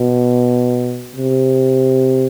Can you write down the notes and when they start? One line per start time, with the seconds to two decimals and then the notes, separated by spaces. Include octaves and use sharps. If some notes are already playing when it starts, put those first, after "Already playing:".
Already playing: B2
1.16 C3